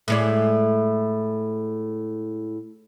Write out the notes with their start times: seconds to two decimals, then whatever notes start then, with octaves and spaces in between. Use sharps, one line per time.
0.08 A2 G#3 D5